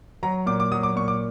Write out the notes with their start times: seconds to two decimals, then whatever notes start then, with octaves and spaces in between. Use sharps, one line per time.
0.23 F#3 A#5
0.46 A#2 D6
0.60 D6
0.72 F#3 D#6
0.83 D6
0.96 A#2 C#6
1.08 D6